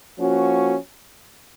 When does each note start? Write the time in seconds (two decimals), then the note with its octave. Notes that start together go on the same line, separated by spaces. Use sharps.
0.18 F3 A#3 C#4 F#4